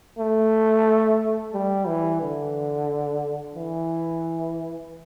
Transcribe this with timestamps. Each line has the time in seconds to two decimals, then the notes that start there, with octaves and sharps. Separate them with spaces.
0.19 A3
1.54 G3
1.87 E3
2.21 D3
3.55 E3